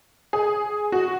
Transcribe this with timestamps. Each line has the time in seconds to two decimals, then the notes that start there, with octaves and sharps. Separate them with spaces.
0.33 G#4
0.92 F#4